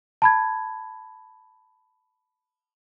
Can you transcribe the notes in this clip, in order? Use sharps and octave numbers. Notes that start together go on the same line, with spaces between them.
A5 B5 G#6